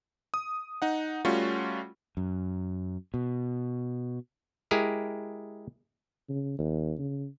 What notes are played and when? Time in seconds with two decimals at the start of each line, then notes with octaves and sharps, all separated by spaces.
0.34 D#6
0.82 D#4 F#5
1.25 G3 A3 C#4 F4 F#4
2.17 F#2
3.14 B2
4.71 G#3 E4 G4 G#4 A#4
6.29 C#3
6.59 D#2
6.99 C#3